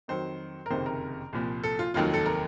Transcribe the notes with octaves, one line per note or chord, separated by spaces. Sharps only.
F2 D#3 F#3 C5
A#4
F#1 F2 C3 D#3 C5
A#4
C2 A#2 F3
A4
F4
F1 D#2 D#3 F#3 F4
A4
A#4